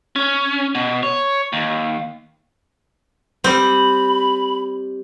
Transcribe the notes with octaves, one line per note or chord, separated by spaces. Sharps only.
C#4
B2
C#5
D#2
G3 C4 B5